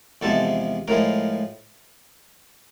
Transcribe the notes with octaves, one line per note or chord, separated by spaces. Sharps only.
E2 C3 F3 G#3 A4
A2 F3 G#3 A#4